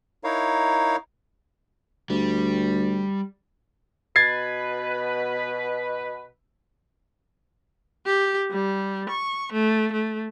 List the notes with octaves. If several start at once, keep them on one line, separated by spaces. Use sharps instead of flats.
D#4 E4 A#4 C#5 F5
D2 G3
B2 B4 G#6 A6 C7
G4
G3
C#6
A3
A3